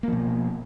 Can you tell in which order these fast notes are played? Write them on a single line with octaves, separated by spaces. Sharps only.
A#3 F3 B2